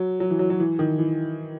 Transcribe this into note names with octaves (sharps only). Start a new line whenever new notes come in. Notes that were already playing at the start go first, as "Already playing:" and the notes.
Already playing: F#3
F#3
E3
F#3
F#3
E3
D#3
E3